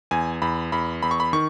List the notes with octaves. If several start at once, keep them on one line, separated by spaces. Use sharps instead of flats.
E2 G#5
E2 B5
E2 B5
E2 B5
C#6
B5
D#3 C#6